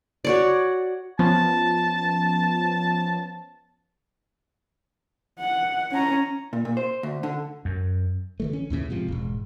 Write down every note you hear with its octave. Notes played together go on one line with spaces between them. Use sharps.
F#4 C#5 D5
F3 B3 C#4 A5
F#5
C#4 A#5
A#2
A#2
C5
D2
D3
F#2
D3 E3 A3
C#4
D#2 A2 C#3 E3
G#2 C3 F3
E1 G#2